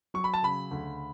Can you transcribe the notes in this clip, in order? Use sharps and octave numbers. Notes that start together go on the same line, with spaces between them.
F#3 C#6
B5
A5
C#3 B5
D2